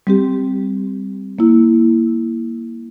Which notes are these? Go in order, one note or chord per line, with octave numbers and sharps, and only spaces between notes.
G3 C4 G4
A#3 E4